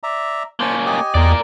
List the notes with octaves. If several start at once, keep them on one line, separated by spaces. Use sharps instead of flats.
D5 E5 A#5
A#3 C#4 C5 A5
G4 D#5 G#5
E2 A#4 D5